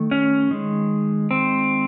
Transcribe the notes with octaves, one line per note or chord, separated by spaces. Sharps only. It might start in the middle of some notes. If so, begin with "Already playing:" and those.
Already playing: D#3 A3
C#4
D#3 G#3
C4